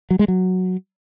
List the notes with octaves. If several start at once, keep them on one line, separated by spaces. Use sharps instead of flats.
F#3
G#3
F#3